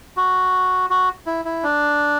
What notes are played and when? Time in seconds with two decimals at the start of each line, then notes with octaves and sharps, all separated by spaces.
0.17 F#4
0.90 F#4
1.26 E4
1.45 E4
1.63 D4